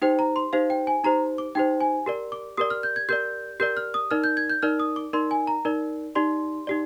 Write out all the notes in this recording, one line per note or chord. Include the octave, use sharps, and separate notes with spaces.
D#4 G4 C5 G5
A#5
C6
D#4 G4 C5 F5
G5
G#5
D#4 G4 C5 A#5
D6
D#4 G4 C5 G5
G#5
G4 A#4 D5
D6
G4 A#4 D5 D#6
F6
G6
G#6
G4 A#4 D5 G6
G4 A#4 D5 G6
F6
D#6
D#4 A#4 D5 F6
G6
G#6
G6
D#4 A#4 D5 F6
D#6
D6
D#4 A#4 D5 C6
G#5
A#5
D#4 A#4 D5
D#4 G4 D5 C6
D#4 G4 D5